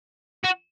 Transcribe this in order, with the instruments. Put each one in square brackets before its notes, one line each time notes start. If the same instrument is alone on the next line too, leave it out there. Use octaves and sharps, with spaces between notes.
[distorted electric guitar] F#4